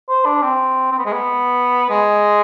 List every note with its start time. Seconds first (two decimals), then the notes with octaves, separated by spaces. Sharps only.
0.09 C5
0.26 D4
0.42 C4
0.92 C4
0.99 B3
1.06 G#3
1.13 B3
1.90 G#3